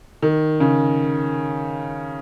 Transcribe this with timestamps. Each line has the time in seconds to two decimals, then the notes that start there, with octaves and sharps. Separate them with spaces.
0.22 D#3
0.60 C#3